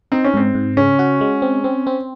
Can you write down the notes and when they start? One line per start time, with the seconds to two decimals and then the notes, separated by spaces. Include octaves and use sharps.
0.12 C4 D#4
0.25 C#4
0.34 G#2 C4
0.55 G#2
0.77 C#3 C#4
0.99 F#4
1.21 G#3
1.42 C4
1.64 C4
1.87 C4